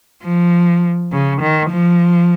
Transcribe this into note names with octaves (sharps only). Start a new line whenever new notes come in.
F3
C#3
D#3
F3